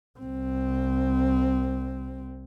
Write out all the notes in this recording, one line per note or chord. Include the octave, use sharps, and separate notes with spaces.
C2 C4